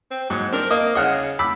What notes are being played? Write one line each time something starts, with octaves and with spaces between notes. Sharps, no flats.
C4
G#2 F#3
C4 D4 A#4
A#3 D#5
C#3 D#5 F#5 F6
B5 D6 E6